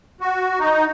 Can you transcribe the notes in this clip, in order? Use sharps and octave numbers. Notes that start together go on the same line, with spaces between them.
F#4
D#4